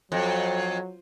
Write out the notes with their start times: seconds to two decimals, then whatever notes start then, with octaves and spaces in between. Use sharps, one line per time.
0.12 F2 F#3